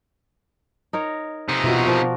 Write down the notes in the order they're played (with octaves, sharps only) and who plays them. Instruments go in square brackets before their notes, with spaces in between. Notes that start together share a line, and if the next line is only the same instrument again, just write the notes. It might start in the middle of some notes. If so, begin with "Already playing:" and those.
[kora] D#4 A#4 C#5
[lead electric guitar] C3 D#4
[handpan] B2 F4 F#4 [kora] E3 A#4 D#5
[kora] F3 A#4 D5